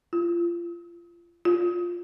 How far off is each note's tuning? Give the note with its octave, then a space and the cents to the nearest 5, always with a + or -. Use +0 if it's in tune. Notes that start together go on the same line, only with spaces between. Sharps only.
F4 -25
F4 +5